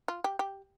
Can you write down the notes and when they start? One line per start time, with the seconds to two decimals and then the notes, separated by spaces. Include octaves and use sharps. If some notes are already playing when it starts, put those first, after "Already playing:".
0.08 F4
0.24 G4
0.39 G4